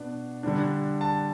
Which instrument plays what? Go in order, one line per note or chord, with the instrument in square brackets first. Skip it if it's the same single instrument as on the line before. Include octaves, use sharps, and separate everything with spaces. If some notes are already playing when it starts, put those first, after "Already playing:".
Already playing: [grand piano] B2 B3 D4
D3 G3 D4
A5